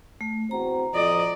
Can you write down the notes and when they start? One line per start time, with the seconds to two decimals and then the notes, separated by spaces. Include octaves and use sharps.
0.21 A3
0.51 E2 C4 F#4 A#5
0.94 F2 D5 D#5